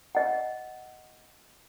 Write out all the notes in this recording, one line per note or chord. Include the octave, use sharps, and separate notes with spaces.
D#5 F#5